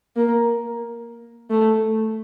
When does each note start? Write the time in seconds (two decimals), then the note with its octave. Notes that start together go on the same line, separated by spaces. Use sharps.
0.16 A#3
1.50 A3